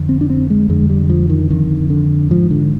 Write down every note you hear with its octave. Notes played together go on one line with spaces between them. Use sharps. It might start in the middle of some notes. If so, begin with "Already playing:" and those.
Already playing: F2 D3
C4
D4
C4
G#3
F2 D3 G#3
G3
F3
D#3
F2 D3 D#3
D3
G#2 F3
D3